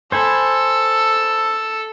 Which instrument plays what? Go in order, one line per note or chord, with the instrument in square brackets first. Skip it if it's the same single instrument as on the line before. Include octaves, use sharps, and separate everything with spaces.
[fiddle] A4 [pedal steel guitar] C5 G#5 B5